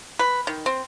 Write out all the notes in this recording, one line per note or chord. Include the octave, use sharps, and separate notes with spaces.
B4
D#3
C4